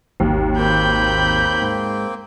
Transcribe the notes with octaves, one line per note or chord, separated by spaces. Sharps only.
G#1 D#2
A#3 C4 G5 B5 G6
G#2